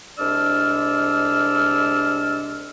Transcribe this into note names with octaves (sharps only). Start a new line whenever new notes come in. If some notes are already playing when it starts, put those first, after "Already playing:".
C2 G#3 D4 D5 E6 F6